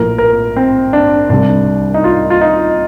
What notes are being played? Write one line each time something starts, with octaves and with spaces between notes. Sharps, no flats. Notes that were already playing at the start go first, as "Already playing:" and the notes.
Already playing: A#1 A2 F3 A#3 A#4
A#4
C4
D4
C2 C3 G3 D4
D#4
F4
F4
D#4